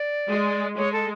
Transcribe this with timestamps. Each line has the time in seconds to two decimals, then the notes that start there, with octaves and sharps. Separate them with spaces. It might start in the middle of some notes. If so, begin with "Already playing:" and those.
Already playing: D5
0.29 G#3
0.76 G#3 C#5
0.93 A4